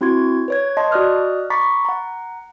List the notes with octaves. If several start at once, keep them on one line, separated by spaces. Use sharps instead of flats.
C4 E4 F#4 C6 G#6
B4 C#5 G#6
D#5 A5 C6
F#4 D5 D#5 D#6 F6 F#6
A#5 B5 C#6 D6 A6 B6
F#5 A#5